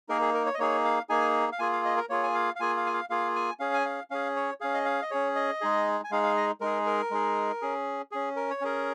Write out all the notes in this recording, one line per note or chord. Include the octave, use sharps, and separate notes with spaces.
A#3 D#4 G#4 A#4
G#4
A#4
C#5
D#5
A#3 D#4 G#4 C#5
F5
A#3 D#4 G#4 G#5
F5
A#3 F4 G#4 G#5
F5
D#5
A#4
A#3 F4 G#4 C#5
G#5
F5
F5
A#3 F4 G#4 G#5
F5
G#5
F5
A#3 F4 G#4 F5
G#5
C#4 G#4 F5
G#5
F5
C#4 G#4 F5
C#5
C#4 G#4 F5
D#5
F5
D#5
C#4 G#4 C#5
D#5
G#3 D#4 G#4
G#5
G#3 D#4 G#4 F5
F5
D#5
G#3 D#4 G#4 A#4
A#4
G#3 D#4 G#4
C#4 G#4
C#4 G#4
A#4
C#5
C#4 G#4 A#4